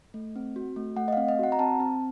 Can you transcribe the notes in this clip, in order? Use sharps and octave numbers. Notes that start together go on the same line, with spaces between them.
A3
C4
F#4
A3
A3 F#5
D#5
C4 F5
D#5
F#4 F#5
A#5
C4 A5
C4